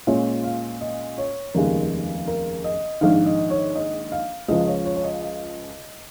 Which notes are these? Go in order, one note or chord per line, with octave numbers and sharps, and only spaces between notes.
A#2 G#3 C#4 F4 C#5
F5
D#5
C#5
F1 D#2 C#3 G#3 A#4
A#4
D#5
A#1 G#2 D#3 F5
D#5
C#5
D#5
F5
C#2 C#3 F3 D#5
C#5
C#5
C#5
D#5
D#5